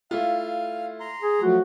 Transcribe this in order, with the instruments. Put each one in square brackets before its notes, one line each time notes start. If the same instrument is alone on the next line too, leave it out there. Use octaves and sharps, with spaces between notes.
[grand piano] A3 E4 F4 [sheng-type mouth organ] F5
[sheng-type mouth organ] A#5 C6
[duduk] G#4
[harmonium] F3 F#3 A3 [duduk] F#4